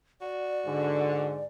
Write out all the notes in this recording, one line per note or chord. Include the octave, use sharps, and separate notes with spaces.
F#4 D5
G#2 D3